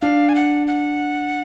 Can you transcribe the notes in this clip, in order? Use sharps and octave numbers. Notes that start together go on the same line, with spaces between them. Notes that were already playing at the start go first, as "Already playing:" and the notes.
D4 F5
G#5
F#5
F#5